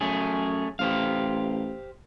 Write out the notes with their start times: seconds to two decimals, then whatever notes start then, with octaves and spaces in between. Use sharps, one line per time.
0.01 F#2 A3 C#4 G#4
0.79 A1 G4 C5 F5